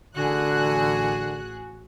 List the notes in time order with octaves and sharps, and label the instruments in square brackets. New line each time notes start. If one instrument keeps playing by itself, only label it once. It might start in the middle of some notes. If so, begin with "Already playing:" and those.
[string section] A1 G#4 F#6 [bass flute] D3 [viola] F#4